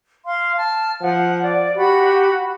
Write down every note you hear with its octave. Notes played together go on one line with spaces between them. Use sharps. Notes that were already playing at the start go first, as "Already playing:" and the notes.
F5 C6
A5 F6
F3 F#5
D5
F#4 G4 F#5 B5